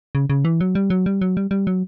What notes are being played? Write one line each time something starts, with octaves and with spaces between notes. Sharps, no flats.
C#3
C#3
E3
F#3
G3
F#3
G3
F#3
G3
G3
F#3